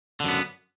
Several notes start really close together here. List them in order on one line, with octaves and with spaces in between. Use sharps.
D3 F#2 B3